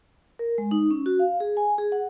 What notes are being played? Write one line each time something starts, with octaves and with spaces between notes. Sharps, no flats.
A#4
G#3
D#4
C#4
F#4
F5
G#4
G#5
G#4
F#5